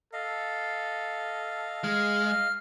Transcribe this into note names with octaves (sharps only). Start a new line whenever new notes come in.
A4 D#5 F5
G#3 F6